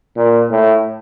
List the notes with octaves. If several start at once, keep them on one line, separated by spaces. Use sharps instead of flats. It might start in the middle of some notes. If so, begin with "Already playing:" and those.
A#2
A2